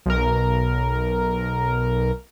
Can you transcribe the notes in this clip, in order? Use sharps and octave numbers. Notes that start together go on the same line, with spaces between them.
B1 A#4